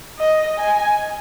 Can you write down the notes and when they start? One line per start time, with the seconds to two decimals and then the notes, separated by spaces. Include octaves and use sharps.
0.19 D#5
0.58 G#5